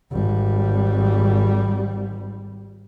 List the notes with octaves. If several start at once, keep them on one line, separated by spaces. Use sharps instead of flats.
G#1 G3